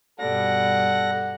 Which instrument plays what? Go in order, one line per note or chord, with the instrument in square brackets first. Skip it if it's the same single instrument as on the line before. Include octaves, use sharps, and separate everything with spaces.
[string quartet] G2 B2 G3 [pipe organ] A4 A#6 [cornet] F#5